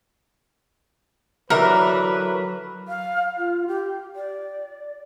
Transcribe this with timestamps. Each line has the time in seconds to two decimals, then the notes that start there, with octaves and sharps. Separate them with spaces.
1.50 D3 E3 F#3 A#4 B4 E5
2.88 F5
3.38 F4
3.68 G4
4.16 D5